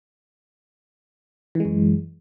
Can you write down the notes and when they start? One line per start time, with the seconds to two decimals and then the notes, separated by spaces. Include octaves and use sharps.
1.55 E3
1.60 G#3
1.65 F#2